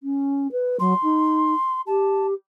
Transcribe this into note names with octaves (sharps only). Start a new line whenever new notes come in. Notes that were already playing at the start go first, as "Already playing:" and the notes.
C#4
B4
F#3 C6
D#4
G4 A5